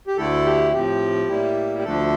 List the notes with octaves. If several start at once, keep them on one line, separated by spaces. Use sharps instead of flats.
G4
D2 D3 A3 E4 A4
G4
A2 F3 C4 G4
A2 G3 A#3 E4
G4
D2 D3 F3 A3 D4 A4